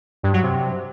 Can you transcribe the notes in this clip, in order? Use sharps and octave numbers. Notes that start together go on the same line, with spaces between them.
G2
F#3
C3